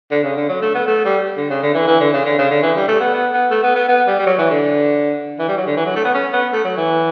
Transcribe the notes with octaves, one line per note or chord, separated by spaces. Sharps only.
D3
C#3
D3
F#3
A3
B3
A3
G3
D3
C#3
D3
E3
E3
D3
C#3
D3
C#3
D3
E3
G3
A3
B3
B3
B3
A3
B3
B3
B3
G3
G3
F#3
E3
D3
E3
G3
F#3
D3
E3
F#3
A3
B3
C#4
B3
A3
F#3
E3